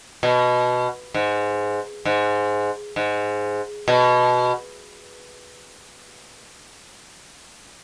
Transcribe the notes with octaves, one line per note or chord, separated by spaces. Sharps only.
B2
G#2
G#2
G#2
B2